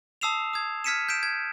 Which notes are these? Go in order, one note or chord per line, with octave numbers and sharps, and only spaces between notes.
A5 D#6 E6 C7 E7 F7
D#6 G#6
F6 G#6 B6 C#7 D#7 E7
G6 B6 D7 E7
G#6